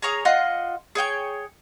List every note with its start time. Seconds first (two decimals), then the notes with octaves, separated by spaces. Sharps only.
0.02 G#4 A#4 C#5 A#5
0.25 F4 D#5 F#5 C6
0.95 G#4 C#5 G5 C#6